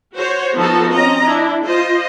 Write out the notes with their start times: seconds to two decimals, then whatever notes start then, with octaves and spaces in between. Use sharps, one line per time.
0.15 F#4 C5 C#5
0.57 F3 B3 D#4 F#4 A4 A5
0.92 C4 C#4 D#5 A#5
1.24 D4 E4
1.66 F4 C5 D#5